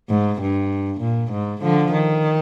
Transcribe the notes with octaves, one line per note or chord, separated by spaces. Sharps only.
G#2
G2
A#2
G#2
D3 F3
D#3